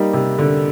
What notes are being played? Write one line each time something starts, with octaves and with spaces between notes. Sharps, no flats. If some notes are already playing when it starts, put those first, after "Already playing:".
Already playing: G3 A#3 D#4
C3
D3